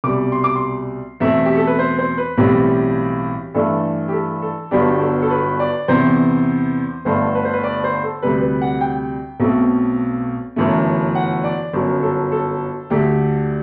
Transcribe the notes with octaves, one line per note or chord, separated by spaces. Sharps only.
C2 B2 G3 D6
C6
D6
C6
E2 B2 A3 C4 E5
G4
A4
B4
C5
C5
B4
B1 A2 E3 G3 C4 G4
G2 E3 A3 D4 A4
G4
A4
A4
G1 G2 F#3 B3 D4 G4
A4
A4
B4
D5
E2 C3 E3 B3 C5
G1 G2 D3 A3 C5
B4
C5
B4
D5
C5
A4
D2 C3 G3 B4
B4
F#5
G5
B1 B2 A3 C4
G1 F#2 E3 A3
F#5
D5
G1 F#2 F#3
A4
A4
D2 D3 A3 G4